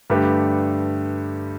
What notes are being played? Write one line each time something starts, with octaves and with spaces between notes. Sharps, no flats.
G2 D3 A3 G4 B4